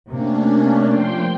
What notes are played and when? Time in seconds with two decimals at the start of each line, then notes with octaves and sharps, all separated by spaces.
0.10 C3 A3 A#3 C#4 D4
0.86 F3 G5 C6